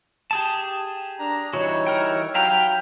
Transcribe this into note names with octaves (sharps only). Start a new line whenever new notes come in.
G4 G#4 A5
D4 A#5
E3 G3 D#4 F#4 C#5
E3 A#4 G5
F#3 B4 F5 G5 A#5